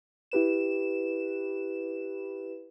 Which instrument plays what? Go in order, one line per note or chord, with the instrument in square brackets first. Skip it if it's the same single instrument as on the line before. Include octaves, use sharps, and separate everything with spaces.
[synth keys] E4 G4 B4 E7